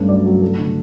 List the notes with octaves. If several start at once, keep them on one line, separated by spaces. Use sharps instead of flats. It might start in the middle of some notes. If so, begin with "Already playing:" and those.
Already playing: G2 A3 C#4 A4
F#3 D5
F#3
A3 A4
D3